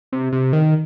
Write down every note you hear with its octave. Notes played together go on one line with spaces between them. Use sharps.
C3
C3
D#3